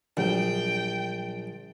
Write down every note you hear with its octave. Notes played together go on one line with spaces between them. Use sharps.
A#1 D3 F#3 G3 G5